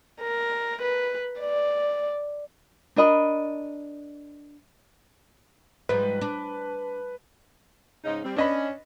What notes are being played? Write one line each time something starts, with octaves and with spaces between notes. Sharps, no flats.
A#4
B4
D5
D4 A#4 D#5 B5
G#2 F3 G3 B4
D4
G#2 C#3 D#4
G3 C4
C#4 D4 D#5 B5